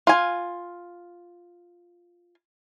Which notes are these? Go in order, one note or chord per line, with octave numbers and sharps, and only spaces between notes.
F4 G#5